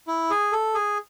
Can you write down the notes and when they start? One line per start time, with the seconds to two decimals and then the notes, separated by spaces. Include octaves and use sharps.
0.08 E4
0.30 G#4
0.52 A4
0.75 G#4